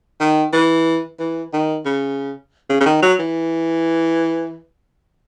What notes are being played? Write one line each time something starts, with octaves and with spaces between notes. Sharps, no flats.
D#3
E3
E3
D#3
C#3
C#3
C#3
D#3
F#3
E3